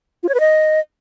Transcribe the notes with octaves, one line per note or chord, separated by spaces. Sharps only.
F4
C#5
B4
D#5